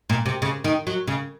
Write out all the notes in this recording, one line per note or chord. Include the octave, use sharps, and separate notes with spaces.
A#2
C3
C#3
D#3
F#3
C#3